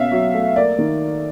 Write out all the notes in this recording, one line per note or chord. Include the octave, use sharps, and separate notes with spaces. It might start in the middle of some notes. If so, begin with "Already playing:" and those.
Already playing: B2 C#4 E5 F5
F#3
A3
A#3 D5
D#3